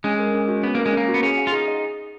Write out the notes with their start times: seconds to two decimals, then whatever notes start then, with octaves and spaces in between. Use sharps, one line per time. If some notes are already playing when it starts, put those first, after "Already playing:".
0.04 G#3 C#4
0.19 A#4
0.34 C#4
0.48 F#4
0.63 B3 C#4
0.75 A#3 A#4
0.86 G#3
0.93 A#3 C#4
1.08 F#4
1.14 B3
1.23 C#4 G#4
1.38 F#5
1.47 F4
1.52 D#4 G#4
1.68 D#5